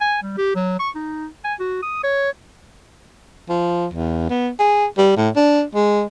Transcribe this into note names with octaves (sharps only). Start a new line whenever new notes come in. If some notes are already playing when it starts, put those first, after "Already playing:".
G#5
G3
G4
F#3
C#6
D#4
G#5
F#4
D#6
C#5
F3
E2
B3
G#4
G3
A2
D4
G#3